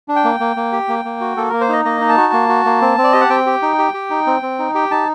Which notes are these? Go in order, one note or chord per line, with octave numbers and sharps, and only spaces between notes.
D4
G5
A#3
A#3
A#3
G4
A#3
A#3
F#4
A#3 A4
A#3 A#4
C5
D#4 D#5
A#3 D#5
D#4
A5
F#4
A#3
F#4
A#3
C4
C4
D5
G4 D#5
F#5
C4 G5
G4
D#4
G4
G4
D#4
C4
C4
D#4
G4 G5
D#4 A5